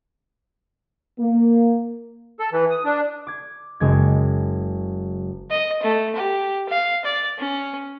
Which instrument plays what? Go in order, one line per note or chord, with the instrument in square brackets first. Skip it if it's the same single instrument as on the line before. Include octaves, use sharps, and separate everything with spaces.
[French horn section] A#3
[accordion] A4
E3
D#6
D4
[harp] D6 G#6
F#1 G#3 G#6
[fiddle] D#5
A3
G4
F5
D5
C#4